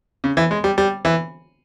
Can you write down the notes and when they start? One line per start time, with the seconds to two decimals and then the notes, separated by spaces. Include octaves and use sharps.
0.24 C#3
0.37 E3
0.51 G#3
0.64 G3
0.78 G3
1.05 E3